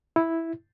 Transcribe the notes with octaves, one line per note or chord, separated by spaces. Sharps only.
E4